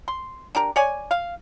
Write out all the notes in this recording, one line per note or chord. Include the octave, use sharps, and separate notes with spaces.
C6
D4 G4 A#4
C#5 D5 G#5
F5